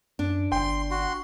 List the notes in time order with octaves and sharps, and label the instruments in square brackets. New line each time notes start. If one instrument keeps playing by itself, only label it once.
[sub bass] F#2 [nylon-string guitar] D4
[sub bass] G1 [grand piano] G5 [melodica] C6
[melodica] F#4 C6